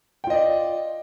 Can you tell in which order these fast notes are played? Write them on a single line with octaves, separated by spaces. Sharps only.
G5 F4 D#5 D5